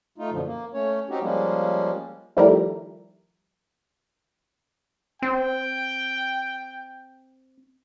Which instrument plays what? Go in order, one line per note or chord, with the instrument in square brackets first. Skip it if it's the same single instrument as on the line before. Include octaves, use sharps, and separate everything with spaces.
[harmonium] A3 D#4 F4
F#2 B2 D3 F3
A#3
A3 C#4 C#5
C4 C#4 D#4 F#4 G4
F3 G3 G#3 A#3 C#4
[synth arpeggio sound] D#3 F3 G3 A3 E4 A#4
[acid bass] C4 [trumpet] G5